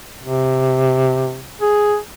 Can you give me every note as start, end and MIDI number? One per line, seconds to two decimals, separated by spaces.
0.23 1.45 48
1.61 1.97 68